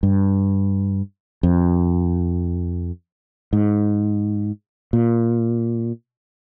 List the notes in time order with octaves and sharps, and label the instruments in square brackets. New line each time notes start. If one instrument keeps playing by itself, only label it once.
[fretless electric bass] G2
F2
G#2
A#2